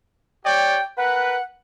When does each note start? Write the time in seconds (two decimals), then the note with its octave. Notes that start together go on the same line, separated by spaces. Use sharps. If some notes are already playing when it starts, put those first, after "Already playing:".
0.45 G4 C#5 D5 G5
0.97 A#4 B4 F#5